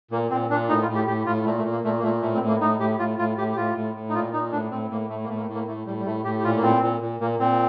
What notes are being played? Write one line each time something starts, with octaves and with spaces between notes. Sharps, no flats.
A#2 A#3
A#2 C4
A#2 D4
A2 D#4
F4
A2
G4
A2 G4
A2 F4
A#2 A3
A3
A#2
A#3
A#2 A3
A#3
A#2 A3
A2 A3
C4
A2
A#3
A2 D#4
A2 G4
A2 F4
A2 F4
A2 G4
G4
A2 F4
A2
A2
D#4
A#2 F4
A#2 D#4
A2 D4
A2 C4
A2 A#3
A2 A3
A#3
A2 A3
A#3
A3
A2
A#3
A2 A3
A2 G3
G3
A2 A3
A2 G4
G4
A#2 F4
A#3
A#2 C4
A#2
A#2
A#2 A#3
A#2 C4